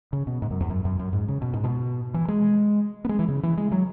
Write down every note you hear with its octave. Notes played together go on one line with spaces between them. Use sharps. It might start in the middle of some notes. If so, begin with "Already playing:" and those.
C#3
B2
G#2
F#2
E2
F#2
F#2
F#2
G#2
C#3
B2
G#2
B2
E3
G#3
B3
G#3
E3
C#3
E3
G#3
F#3